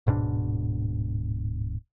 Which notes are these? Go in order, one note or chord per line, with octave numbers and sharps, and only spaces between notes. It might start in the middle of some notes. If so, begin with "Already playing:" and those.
D1 G#2 B2 D4